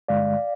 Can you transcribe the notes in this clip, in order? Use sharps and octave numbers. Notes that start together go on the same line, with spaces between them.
G2 D3 G#3 D5 F5